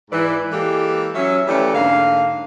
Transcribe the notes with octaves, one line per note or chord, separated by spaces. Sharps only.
G#2 E3 D5
E3 G#3 A#3 G4 A4
F#3 C#4 E5
F2 E3 A3 C#4 G4 D5
G#2 D3 A#3 F5